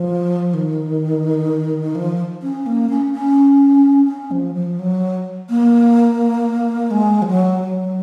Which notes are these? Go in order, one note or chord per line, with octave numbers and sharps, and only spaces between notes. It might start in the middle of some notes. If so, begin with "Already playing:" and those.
Already playing: F3
D#3
F3
C#4
A#3
C#4
C#4
C#4
F3
F3
F#3
A#3
G#3
F3
F#3
F#3